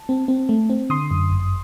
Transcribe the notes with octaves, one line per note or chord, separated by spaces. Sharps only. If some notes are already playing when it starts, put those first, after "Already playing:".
Already playing: A5
C4
C4
A3
C4
D3 C6 D#6
F#2
G1